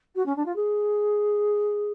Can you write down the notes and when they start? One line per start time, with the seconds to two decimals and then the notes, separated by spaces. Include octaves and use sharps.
0.15 F#4
0.25 C#4
0.36 D4
0.45 F4
0.55 G#4